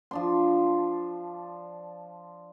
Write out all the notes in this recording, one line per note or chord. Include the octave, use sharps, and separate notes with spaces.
F3 D4 C6